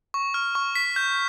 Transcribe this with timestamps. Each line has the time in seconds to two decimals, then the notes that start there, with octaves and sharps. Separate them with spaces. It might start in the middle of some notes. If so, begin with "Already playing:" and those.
0.14 C#6
0.34 F6
0.55 C#6
0.75 B6
0.96 G6